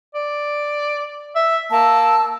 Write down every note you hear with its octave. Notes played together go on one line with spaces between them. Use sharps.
D5
E5
A#3 A5 E6